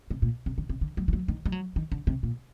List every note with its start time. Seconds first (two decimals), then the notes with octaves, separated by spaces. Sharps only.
0.11 C3
0.22 A#2
0.46 C3
0.58 D3
0.69 C3
0.81 D3
0.97 F#3
1.08 D#3
1.13 F#3
1.28 D#3
1.46 G3
1.52 F#3
1.76 D#3
1.92 D3
2.07 C3
2.23 A#2